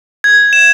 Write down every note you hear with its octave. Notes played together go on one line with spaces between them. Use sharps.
G#6
E7